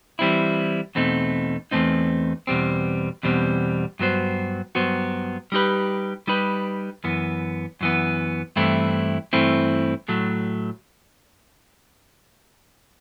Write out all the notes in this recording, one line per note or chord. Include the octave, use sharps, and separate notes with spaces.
E3 G3 C4 E4
E2 B2 A3 C4 D#4
E2 B2 A3 C4 D#4
E2 B2 G3 C4
E2 B2 G3 C4
G2 F#3 B3 F#4 C5
G2 F#3 B3 F#4 C5
G3 D#4 G4 B4
G3 D#4 G4 B4
F#2 E3 B3
F#2 E3 B3
G2 E3 A3 C4 E4
G2 E3 A3 C4 E4
A2 F#3 A3